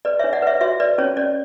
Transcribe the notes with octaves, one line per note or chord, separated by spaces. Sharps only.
B4 D5
C#5 E5
D4
D5 F#5
B4 C#5 E5
F#4 C#5 E5
B4 D5
C#4 C#5
C#4 D5